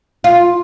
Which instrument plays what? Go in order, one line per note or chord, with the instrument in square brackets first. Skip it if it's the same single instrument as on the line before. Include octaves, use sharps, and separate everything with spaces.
[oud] F4